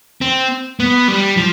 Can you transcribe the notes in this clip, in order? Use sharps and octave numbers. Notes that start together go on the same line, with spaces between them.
C4
B3
G3
F3